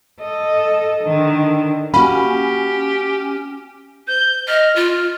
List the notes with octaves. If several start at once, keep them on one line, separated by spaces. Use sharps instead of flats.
A4 D#5
D3 D#3
A#3 C#4 F#4 G4 B5
C5 G6
D#5 F6
F4